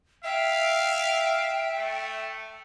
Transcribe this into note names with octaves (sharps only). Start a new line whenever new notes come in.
E5 F5 G5
A3